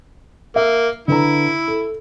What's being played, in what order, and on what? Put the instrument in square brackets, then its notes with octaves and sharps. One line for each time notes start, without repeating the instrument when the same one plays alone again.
[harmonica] A#3 [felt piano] E5
[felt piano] D3 B4 A#5 [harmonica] E4
[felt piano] A4